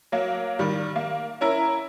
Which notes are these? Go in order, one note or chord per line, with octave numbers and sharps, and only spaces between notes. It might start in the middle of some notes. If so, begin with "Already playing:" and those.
F#3 A#3
D#3 G3
A#3
C#4 E4 A#4 A#5